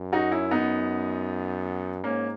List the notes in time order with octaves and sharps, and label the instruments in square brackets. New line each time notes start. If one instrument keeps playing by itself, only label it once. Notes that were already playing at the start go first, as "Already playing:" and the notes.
Already playing: [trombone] F#2
[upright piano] D#4 F#4
C#4 E4
B3 D#4
[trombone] G#2 [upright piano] A#3 C#4